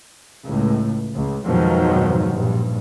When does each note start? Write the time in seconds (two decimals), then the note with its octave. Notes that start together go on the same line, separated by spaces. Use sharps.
0.44 C#2 A2
1.13 C#2
1.45 F2 G#2 B2 D#3 F3 F#3
2.32 A#1 G2